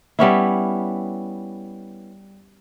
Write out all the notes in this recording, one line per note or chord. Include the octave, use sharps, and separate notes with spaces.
G3 B3 C#4 E4